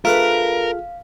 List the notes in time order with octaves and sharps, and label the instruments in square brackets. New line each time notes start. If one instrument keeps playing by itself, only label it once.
[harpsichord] A3 D4 B4 [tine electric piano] F4 G#4 F6 [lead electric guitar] A#4 [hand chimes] F5